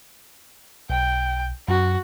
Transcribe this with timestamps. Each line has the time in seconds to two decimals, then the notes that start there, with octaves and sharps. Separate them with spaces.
0.90 B1 G5
1.68 F#2 F#4